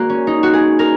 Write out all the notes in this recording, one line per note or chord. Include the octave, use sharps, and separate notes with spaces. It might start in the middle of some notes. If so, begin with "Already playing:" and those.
Already playing: A#3 F#4 G#4
C#4
D#4
F#4
G#4
A#4